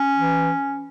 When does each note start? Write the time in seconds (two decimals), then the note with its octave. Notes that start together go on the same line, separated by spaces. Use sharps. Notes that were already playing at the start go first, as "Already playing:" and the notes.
Already playing: C#4
0.15 E3